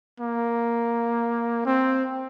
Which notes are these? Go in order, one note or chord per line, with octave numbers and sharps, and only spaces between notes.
A#3
C4